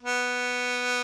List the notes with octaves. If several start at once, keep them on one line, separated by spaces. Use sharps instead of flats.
B3